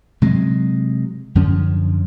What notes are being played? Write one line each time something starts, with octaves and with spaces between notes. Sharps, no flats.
C3 F#3 G#3
F#2 D3 F3 C#4